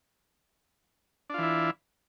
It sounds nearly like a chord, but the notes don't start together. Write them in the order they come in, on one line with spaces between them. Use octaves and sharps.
D4 F4 E3 E4